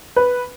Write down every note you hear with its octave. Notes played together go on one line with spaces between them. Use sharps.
B4